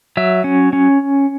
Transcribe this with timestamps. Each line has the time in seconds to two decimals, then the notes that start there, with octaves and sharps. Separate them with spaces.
0.17 F#3 E5
0.44 C#4
0.73 C#4